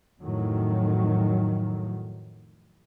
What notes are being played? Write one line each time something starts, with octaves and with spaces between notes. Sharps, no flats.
F2 A2 D#3 F#3